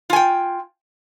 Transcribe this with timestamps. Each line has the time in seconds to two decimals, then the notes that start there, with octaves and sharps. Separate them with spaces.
0.10 F4
0.13 G#5
0.16 G5